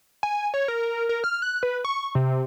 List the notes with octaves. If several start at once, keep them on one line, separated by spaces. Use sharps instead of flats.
G#5
C#5
A#4
A#4
F6
F#6
B4
C#6
C3